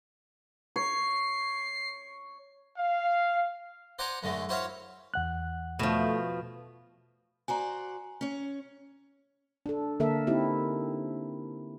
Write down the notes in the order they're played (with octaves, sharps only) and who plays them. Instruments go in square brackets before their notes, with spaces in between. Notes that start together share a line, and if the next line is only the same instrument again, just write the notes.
[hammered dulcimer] C#5 [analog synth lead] C7
[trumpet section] F5
[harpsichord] C5 D5 F#5 G#5 A#5
F#2 D3 G#3 A3
E4 F#4 C5 C#5 E5 F5
[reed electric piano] E2 F#5 F#6
[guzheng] B2 F3 [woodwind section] A3
[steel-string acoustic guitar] F#4 C5 D5 [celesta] G#5 A#5
[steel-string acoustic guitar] C#4 C#5
[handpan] D4 A4
D3 A#3 A4 A#4 E5
C4 D#4 E4 G4